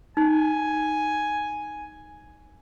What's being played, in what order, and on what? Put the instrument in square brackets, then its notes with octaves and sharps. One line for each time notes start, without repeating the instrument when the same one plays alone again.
[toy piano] D#4 [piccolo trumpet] G#5